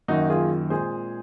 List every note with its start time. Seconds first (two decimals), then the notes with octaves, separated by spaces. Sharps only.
0.08 F#2 D#3 A#3 D#4 F#4
0.30 F4 G#4
0.70 A#2 G#3 C4 G#4 C5